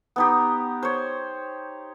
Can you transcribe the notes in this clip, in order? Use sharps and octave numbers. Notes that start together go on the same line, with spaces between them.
B3 D#4 G4
C5 C#5